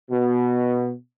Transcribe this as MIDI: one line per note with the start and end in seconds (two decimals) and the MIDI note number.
0.11 0.91 47